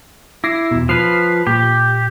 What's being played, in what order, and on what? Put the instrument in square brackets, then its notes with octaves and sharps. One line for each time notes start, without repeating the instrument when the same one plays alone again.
[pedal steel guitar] E4 [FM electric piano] D6 A#6 C7
[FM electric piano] E2 B2
[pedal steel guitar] F3 B4 [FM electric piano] F6 C7
[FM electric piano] A#2 [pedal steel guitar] G4